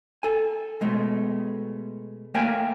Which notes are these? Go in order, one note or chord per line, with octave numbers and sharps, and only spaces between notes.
A4 G#5
B2 G#3 A3
A3 A#3 A#4 F5 G5 G#5